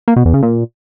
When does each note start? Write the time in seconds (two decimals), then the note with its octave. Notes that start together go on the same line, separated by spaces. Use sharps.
0.08 A#3
0.16 B2
0.25 E2
0.34 C#3
0.43 A#2